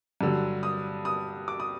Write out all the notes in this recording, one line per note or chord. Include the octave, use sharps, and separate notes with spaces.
G2 D3 F#3
D#6
D#6
D6
D#6